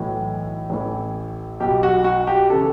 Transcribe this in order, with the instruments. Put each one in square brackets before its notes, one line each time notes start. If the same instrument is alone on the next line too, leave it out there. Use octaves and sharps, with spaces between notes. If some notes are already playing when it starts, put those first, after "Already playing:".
Already playing: [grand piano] B1 A2 E3
A1 A2 E3
B1 B2 G4
F#4
F#4
G4
C#3 E3 A4